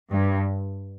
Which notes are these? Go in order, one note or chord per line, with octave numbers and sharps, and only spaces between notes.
G2